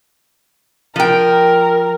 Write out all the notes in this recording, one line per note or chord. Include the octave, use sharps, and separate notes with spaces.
F3 A#4 G5